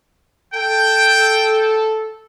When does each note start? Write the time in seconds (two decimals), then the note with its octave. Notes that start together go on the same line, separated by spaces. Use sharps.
0.54 A4 G5